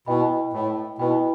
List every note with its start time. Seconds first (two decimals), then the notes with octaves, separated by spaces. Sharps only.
0.06 B2 E4 B4 D#5 G5 B5
0.53 A2
0.98 B2 E4 B4 D#5 G5 B5